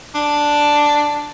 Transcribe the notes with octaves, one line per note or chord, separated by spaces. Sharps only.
D4